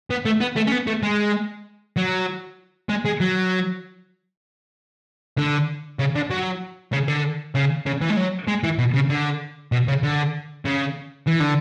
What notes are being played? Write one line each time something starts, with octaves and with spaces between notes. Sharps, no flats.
B3
A3
B3
A3
C#4
B3
A3
G#3
F#3
G#3
G#3
F#3
D3
C#3
D3
F#3
C#3
D3
C#3
C#3
E3
G#3
F#3
G#3
E3
B2
C#3
D3
B2
C#3
D3
C#3
E3
D3